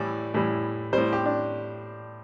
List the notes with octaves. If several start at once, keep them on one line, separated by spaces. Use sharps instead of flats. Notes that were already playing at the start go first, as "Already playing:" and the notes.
Already playing: A2 E3 G3 D5
A2 E3 G3
A2 G3 C5
G4
D4